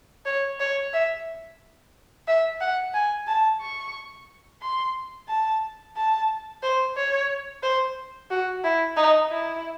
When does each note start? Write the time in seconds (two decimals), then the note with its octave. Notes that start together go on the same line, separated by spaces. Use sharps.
0.26 C#5
0.60 C#5
0.93 E5
2.28 E5
2.61 F#5
2.94 G#5
3.27 A5
3.61 C#6
4.62 C6
5.29 A5
5.96 A5
6.63 C5
6.97 C#5
7.63 C5
8.30 F#4
8.64 E4
8.97 D#4
9.30 E4